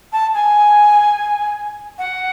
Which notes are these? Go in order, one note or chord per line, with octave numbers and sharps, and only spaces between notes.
A5
G#5
F#5